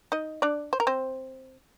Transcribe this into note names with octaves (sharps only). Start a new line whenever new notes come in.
D#4 D#5
D4 D5
C5
A#4
C4 C5